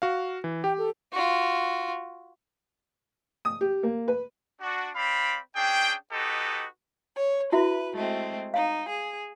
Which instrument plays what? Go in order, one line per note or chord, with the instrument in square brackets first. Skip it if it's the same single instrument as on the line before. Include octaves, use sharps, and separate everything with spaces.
[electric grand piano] F#4 F5
E3
[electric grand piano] G4 [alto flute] G5
[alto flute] A4
[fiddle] F4 F#4
[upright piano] D#6
G4
A#3
B4
[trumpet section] D4 F#4
C4 D5 F5 B5
C#4 D4 G#4 G5
D#4 F#4 G4 A4 B4 D#5
[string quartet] C#5
[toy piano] E4 F#4 E5 [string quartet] B4
[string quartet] G#3 A3 C4
[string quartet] D#4 [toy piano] F5
[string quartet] G#4